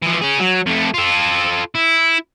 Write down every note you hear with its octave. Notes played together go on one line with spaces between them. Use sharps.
E3 F3
C#4 G#4
F#3
F2 A3
F4 A4
E4